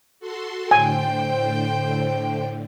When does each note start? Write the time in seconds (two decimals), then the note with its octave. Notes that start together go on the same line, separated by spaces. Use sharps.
0.20 F#4 A4 C6
0.71 A2 D3 C5 G5 G#5